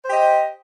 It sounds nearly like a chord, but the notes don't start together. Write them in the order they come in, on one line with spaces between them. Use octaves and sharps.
C5 G4 D#5